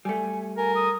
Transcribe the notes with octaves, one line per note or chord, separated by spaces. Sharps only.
G3 A3 G#5
A#4 G#5
D#6